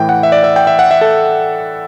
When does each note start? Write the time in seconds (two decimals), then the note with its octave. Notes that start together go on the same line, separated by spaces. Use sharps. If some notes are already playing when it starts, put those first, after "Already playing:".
Already playing: A2 E3 G5
0.09 F#5
0.23 E5
0.32 D5
0.44 E5
0.56 G5
0.67 E5
0.79 F#5
0.91 E5
1.01 A4